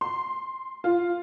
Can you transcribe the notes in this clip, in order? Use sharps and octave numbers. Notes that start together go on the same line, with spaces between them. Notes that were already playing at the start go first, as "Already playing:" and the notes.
C6
F4